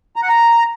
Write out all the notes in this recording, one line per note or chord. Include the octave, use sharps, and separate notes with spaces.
A#5
F#5
A#5